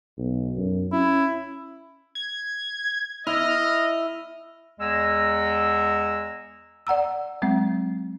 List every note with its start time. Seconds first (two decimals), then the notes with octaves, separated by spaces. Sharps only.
0.18 B1
0.57 F#2
0.92 C#4 E4
2.15 G#6
3.27 E4 D#5 F6
4.80 E2 G#3 G#5 A#5 E6
6.87 D5 F#5 A#5 E6
7.42 F#3 G#3 C4